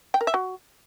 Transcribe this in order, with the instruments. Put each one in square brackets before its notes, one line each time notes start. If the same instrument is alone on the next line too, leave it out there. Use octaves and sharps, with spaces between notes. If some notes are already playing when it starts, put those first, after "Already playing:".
[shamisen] G5
A#4
E5
F#4